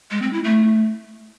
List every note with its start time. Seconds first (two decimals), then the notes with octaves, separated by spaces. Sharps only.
0.11 G#3
0.22 C4
0.33 E4
0.44 A3